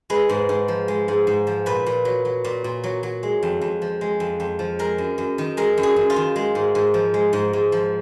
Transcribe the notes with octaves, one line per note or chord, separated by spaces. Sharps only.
G#3 B4
G#2
G#2
F3
G#3
G#2
G#2
F3
A#2 B4
A#2
F#3
F#3
A#2
A#2
F#3
F#3
G#3
F2
F2
F3
G#3
F2
F2
F3
G#3 A#4
F#2
F#2
D#3
G#3 A#4
F#2
G#4
F#2
F4
D#3
G#3
G#2
G#2
F3
G#3
G#2
G#2
F3